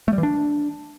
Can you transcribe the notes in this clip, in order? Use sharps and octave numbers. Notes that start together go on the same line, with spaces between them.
A3
G3
E3
D4